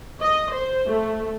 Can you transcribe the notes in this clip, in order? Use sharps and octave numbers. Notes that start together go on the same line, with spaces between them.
D#5
C5
A3